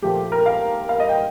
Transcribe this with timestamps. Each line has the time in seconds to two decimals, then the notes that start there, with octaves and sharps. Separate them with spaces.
0.02 A#2 F3 A3 G4
0.32 A#4
0.46 F5
0.89 F5
1.00 D#5
1.09 G5